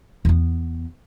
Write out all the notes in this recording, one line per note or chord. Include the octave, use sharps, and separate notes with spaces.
E2 B3